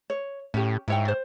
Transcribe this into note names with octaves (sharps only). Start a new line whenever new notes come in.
C#5
A2 C#4 G4
G#2 E4 C#5 G5
C5